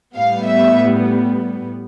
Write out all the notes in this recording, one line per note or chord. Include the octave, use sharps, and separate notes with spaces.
A2 G3 B3 F5
E5